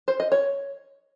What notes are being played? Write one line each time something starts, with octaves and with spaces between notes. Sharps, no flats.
C5
D#5
C#5